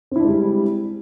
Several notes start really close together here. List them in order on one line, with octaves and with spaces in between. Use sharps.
C4 E4 D4 G#3 G3